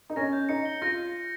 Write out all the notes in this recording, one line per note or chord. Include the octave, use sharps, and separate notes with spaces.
D#4
C#4 A#6
G6
D#4 C#7
G7
F4 A#6